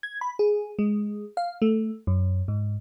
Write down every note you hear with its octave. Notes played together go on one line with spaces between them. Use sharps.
G#6
B5
G#4
G#3
F5
A3
F#2
G#2